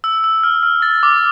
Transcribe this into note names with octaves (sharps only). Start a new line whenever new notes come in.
E6
E6
F6
F6
A6
D6